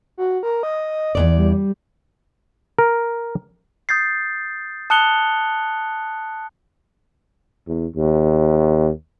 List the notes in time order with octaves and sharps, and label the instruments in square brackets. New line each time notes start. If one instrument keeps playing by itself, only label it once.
[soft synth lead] F#4
A#4
D#5
[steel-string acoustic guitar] E2 G#2 D5
[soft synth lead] G3
[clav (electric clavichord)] A#4
[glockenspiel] D#6 G6 A6 C7
A5 D#6 F#6 C#7 F7 G7
[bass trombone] E2
D#2